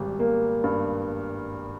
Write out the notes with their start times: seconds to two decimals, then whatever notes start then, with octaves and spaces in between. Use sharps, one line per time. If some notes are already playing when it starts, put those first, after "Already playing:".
Already playing: G#1 G3
0.19 A#3
0.64 G2